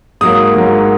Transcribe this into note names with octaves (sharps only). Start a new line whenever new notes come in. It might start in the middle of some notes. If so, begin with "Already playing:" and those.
G#2 F#3 A#3 D#6
G#2 F#3 A#3